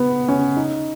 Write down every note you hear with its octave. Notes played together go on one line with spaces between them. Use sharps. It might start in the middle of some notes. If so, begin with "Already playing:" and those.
Already playing: B3
C#4
D#4